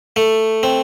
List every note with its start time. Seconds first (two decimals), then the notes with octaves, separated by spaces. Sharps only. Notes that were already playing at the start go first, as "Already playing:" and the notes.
0.16 A3
0.63 C4